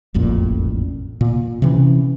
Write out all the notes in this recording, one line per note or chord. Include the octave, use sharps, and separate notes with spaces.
E1 A1 F2 A#2
A#2
C3 E3 C#4